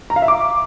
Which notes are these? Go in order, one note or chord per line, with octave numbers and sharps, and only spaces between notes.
A#5
F5
E5
D6